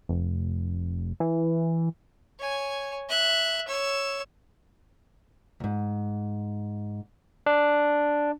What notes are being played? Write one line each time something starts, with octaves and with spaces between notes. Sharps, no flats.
F1
E3
C#5 G#5
E5 F#6
C#5 E6
D#2 G#2
D4